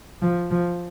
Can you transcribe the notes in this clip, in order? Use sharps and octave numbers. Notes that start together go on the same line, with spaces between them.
F3
F3